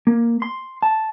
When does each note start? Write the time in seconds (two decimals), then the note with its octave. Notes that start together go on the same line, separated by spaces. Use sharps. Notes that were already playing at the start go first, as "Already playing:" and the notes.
0.07 A#3
0.42 C6
0.82 A5